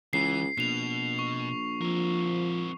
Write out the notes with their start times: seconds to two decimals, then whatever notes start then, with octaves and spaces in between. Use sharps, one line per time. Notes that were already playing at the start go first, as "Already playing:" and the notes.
0.13 C#2 E3 C7
0.58 A#1 B2 C7 F7
1.19 C#6
1.82 F3 C4 A#4